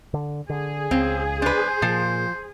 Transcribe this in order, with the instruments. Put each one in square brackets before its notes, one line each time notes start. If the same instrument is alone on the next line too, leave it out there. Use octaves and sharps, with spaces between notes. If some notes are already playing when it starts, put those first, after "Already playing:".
[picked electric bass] D3
[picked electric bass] D3 [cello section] G#4
[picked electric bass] C#2 [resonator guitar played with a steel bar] C4
[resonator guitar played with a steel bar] D4 B4 [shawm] C5
[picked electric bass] A#2 [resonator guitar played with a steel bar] F3